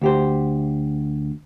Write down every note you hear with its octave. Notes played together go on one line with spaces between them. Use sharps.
D2 G4 C5